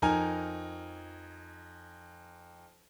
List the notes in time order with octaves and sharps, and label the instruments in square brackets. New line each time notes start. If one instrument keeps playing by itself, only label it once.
[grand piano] F2 D#4 A#4 G#5 F6